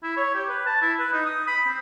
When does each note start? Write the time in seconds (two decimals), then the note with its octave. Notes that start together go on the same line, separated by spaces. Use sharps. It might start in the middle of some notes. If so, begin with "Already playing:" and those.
0.03 E4
0.17 C#5
0.35 G4
0.49 B4
0.66 A5
0.82 E4
0.99 B4
1.13 D#4
1.26 D#6
1.47 B5
1.66 C4